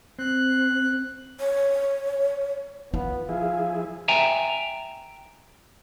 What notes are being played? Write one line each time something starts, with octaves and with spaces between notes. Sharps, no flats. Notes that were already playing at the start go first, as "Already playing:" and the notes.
C4 F#6
C#5
B3 F4
F3 E4 G#4 F5
E5 G5 G#5 A#5